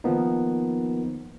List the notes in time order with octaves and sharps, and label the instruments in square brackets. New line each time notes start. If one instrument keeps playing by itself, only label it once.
[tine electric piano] D#3 F3 A#3 B3 D#4